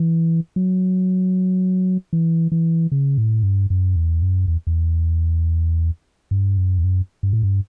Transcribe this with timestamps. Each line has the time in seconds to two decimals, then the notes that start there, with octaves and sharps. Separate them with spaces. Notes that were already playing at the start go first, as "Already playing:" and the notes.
Already playing: E3
0.56 F#3
2.13 E3
2.52 E3
2.92 C#3
3.18 A2
3.43 G2
3.70 F#2
3.96 E2
4.22 F#2
4.48 E2
4.67 E2
6.31 G2
6.57 F#2
6.78 E2
6.84 F#2
7.23 G2
7.33 A2
7.43 G2